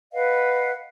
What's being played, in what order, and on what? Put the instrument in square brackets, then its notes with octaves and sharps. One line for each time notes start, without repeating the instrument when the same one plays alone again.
[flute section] B4 D#5 F5 F#5